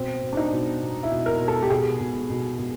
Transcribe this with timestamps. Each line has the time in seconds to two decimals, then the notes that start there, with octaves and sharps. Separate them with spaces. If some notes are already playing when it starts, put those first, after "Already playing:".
Already playing: B2 C4
0.23 B2
0.33 D4
0.37 D#4
0.52 B2
0.82 B2
1.03 E4
1.11 B2
1.26 A#4
1.40 B2
1.48 A4
1.62 G4
1.70 B2 G#4
2.01 B2
2.30 B2
2.59 B2